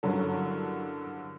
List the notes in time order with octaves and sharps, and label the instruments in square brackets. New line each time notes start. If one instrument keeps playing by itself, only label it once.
[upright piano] G2 D3 C#4 [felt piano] F#3 E4 [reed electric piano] A4 A#4